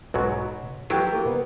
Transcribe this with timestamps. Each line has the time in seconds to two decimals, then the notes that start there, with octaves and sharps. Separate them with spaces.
0.14 B1 G#2 B2 F#3
0.90 E3 F#3 E4 F4 G4
1.13 A#3
1.26 B3